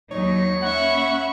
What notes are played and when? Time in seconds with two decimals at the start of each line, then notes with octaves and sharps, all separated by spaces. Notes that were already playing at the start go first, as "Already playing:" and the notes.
0.11 D#2 F#3 D#4 C#5
0.62 A#3 C#4 E5 F#5 B5 C#6